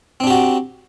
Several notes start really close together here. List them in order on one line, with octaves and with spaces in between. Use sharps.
C4 D4 G4 F#4